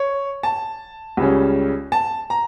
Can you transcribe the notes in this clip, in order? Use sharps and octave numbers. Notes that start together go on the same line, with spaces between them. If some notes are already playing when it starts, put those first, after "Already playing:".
Already playing: C#5
A5
C#2 C#3 G3 C#4
A5
A#5